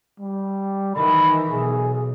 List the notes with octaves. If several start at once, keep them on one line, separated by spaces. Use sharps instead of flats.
G3
D#3 E3 B5
B1 G#4